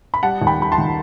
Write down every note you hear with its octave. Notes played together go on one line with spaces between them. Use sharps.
B5
G3 F#5 A5
D#2
G5 B5
G3 B5
A5 C6
D#3